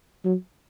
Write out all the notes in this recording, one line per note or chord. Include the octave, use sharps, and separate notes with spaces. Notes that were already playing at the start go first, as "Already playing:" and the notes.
F#3